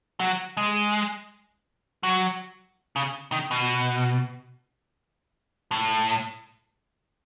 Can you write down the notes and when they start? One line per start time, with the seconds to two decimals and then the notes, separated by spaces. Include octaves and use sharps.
0.20 F#3
0.57 G#3
2.03 F#3
2.96 C#3
3.32 D#3
3.51 B2
5.71 A2